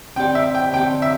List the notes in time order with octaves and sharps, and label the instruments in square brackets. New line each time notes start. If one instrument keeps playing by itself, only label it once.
[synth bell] D3 C4 G4 D5 [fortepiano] G5
[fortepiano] E5
G5
[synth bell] D3 C4 G4 D5 [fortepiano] G5
[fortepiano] E5